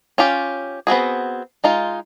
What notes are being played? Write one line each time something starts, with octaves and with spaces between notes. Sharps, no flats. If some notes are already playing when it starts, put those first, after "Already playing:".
C#4 F4 G4
B3 C4 F#4 G#4
G#3 D#4 F4